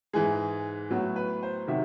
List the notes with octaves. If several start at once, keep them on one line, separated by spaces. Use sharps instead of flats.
G#2 E3 G#3 G#4
A2 F#3 B3
B4
C5
C3 D#3 F#3 E5